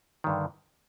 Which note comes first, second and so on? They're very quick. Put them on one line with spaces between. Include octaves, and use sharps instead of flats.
D#3 G2 D3